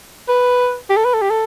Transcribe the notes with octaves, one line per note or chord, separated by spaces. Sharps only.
B4
G4
A4
B4
A4
G4
A4